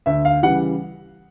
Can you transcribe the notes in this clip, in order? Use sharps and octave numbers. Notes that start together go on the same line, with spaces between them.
D2 E5
F5
C#3 E3 G3 F#5